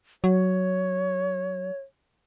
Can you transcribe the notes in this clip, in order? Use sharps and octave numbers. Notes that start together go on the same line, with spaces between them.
F#3 C#5